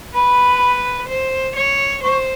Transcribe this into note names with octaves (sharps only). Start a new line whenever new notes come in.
B4 B5
C5
C#5
C5 C#6